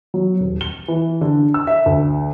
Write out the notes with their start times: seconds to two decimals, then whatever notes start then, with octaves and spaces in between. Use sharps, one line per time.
0.14 F#3
0.41 D#1
0.61 G7
0.88 E3
1.21 D3
1.54 E6
1.67 E5
1.86 D2